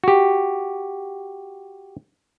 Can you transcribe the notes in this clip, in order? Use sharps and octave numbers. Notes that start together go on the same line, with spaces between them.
F#4 G4